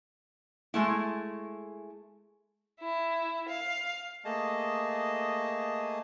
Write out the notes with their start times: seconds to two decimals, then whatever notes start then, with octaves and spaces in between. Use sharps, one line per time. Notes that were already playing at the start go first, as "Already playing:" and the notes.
0.74 G#3 A3 E4
2.80 E4
3.48 F5
4.25 A3 A#3 G#4 D#5 A5